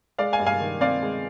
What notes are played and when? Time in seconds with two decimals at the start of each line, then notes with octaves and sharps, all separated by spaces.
0.18 G#3 D5 F5
0.33 F5 G#5
0.39 G2
0.46 F5 G#5
0.60 D#3
0.81 C4 D5 F5
1.02 G#3